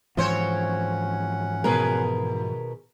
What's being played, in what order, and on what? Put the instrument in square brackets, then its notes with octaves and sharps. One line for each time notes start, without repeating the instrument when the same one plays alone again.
[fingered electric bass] G#2 E3 F3 [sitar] C4 C5 C#5 [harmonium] C#4 F#5
[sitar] D#2 G#4 B4 [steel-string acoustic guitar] B2 A#4